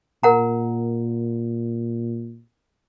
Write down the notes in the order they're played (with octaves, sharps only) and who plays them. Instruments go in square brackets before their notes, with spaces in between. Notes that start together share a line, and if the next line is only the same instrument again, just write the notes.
[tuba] A#2 [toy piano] A#4 F#5 A#5